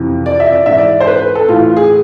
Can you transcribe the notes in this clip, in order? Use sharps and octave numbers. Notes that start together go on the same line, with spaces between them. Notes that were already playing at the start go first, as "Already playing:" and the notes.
Already playing: F2 C3 E3
D5
E5
D5
G#2 E3 E5
D5
C5
B4
B4
A4
A2 E3 F4
F4
G#4